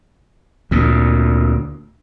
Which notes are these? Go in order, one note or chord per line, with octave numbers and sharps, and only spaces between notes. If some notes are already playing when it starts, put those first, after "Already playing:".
D2 A#2